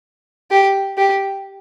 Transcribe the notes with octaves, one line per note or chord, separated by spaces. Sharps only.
G4
G4